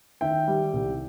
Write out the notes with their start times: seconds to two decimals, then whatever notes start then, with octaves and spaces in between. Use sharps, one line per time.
0.21 D#3 E5 G5
0.48 G3
0.73 C2